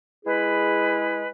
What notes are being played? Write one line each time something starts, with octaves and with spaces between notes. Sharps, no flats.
G#3 E4 G#4 B4